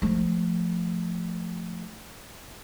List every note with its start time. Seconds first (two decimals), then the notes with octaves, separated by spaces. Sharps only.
0.02 F3 A3